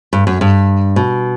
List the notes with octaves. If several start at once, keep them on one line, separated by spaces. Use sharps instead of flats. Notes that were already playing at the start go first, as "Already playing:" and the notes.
G2
F#2
G2
B2